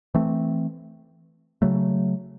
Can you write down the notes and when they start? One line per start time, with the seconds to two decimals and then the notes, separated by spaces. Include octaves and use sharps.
0.14 E3 A3 C4
1.62 C#3 F#3 A3